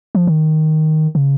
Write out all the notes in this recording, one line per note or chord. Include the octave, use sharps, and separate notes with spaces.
F3
D#3
C#3